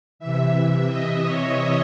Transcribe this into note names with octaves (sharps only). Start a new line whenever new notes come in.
C3 E3 E5
E5
D#5
C#5